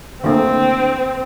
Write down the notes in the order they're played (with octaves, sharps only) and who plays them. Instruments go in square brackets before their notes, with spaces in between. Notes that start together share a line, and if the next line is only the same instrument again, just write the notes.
[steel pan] D3 A3 A#3 [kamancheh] C4